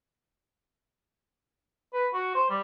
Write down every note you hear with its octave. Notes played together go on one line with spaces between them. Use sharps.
B4
F#4
C5
G3